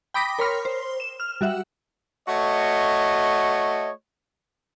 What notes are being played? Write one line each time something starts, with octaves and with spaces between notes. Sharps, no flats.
G5 B5 D6 D#6 A#6 B6
A#4 C#5 B5 C6 F6
C5
E7
F6
G3 F#4 E5 F#5
A3 F#4 C#5 D#5